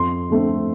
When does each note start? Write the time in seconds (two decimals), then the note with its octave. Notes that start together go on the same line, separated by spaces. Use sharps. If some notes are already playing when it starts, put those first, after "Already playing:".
Already playing: F2 C6
0.30 D3 A3 C4